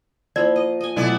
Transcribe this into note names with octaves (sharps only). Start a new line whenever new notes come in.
F3 A#3 E4 D5
D#5
D#5 G#5
B2 F#3 A3 B3 E4 D5